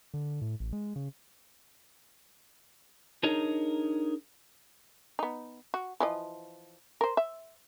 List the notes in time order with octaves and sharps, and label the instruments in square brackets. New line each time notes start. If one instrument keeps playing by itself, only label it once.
[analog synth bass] D3
A2
A1
G#3
C#3
[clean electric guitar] D4 D#4 G#4 A#4 C#5 D#5
[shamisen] B3 D#4
F#4
E3 F3 D#5
A#4 C5
E5